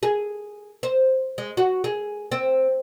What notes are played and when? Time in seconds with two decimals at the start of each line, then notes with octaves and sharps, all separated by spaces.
0.03 G#4
0.83 C5
1.38 G#3
1.57 F#4
1.84 G#4
2.32 C4